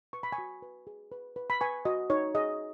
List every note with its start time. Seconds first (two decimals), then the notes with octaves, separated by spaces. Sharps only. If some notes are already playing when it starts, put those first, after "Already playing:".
0.13 B4 C#6
0.23 B5
0.32 G#5 C#6
0.38 F#4
0.62 B4
0.87 G#4
1.12 B4
1.36 B4
1.50 B5
1.61 B4 G#5 C#6
1.85 F#4 D#5
2.10 D#4 C#5
2.35 G#4 D#5